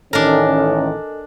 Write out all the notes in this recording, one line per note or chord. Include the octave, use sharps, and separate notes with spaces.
A1 D#3 C#4 D4 A4 A#4 D#5 G#5